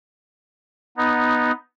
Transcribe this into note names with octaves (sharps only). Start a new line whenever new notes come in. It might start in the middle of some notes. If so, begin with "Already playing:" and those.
B3 D#4